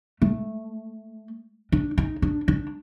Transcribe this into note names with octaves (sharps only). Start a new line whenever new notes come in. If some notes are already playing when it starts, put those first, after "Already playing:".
A3
D4
D#4
D4
D4